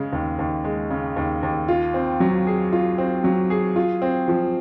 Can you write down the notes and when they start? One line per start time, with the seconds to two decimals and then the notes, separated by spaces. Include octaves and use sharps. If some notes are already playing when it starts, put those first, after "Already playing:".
Already playing: C#3 G#3
0.13 D#2
0.39 D#2
0.64 G#3
0.90 C#3
1.16 D#2
1.43 D#2
1.68 F4
1.94 C4
2.20 F#3
2.47 G#4
2.73 F4
2.98 C4
3.24 F#3
3.50 G#4
3.76 F4
4.02 C4
4.28 F3